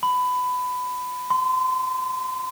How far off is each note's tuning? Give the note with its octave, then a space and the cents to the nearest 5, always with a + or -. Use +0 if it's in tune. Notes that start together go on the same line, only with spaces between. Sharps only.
B5 +20
C6 -35